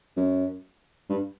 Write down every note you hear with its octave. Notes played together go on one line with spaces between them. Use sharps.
F#2
G2